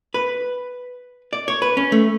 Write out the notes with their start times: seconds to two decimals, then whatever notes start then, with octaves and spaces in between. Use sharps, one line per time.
0.14 B4
1.33 D5
1.48 C#5
1.62 B4
1.77 C#4
1.92 A3